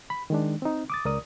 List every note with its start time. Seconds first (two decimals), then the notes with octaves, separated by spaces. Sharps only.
0.10 B5
0.30 D#3 G#3 D4
0.62 C4 D#4
0.90 D6 D#6 A6
1.05 C#2 A#4 D5 D#6